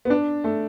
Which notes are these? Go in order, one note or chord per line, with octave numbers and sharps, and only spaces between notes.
B3
D4
A3